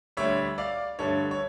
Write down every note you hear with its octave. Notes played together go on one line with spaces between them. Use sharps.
D2 D3 G3 C#5 E5
D5 F5
G2 D3 A3 A4 C#5
C#5